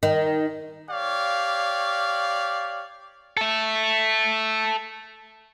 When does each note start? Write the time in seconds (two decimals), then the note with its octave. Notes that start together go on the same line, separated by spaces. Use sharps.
0.03 D#3
0.90 G4 C#5 D5 F5
3.37 A4 E5